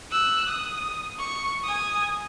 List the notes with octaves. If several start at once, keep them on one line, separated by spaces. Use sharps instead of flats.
E6 F#6
D#6
C#6
G#5 D#6